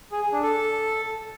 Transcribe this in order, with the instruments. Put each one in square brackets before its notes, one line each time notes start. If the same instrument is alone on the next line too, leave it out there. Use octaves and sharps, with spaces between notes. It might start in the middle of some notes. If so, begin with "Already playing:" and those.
[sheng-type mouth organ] G#4
G#4
D4
A4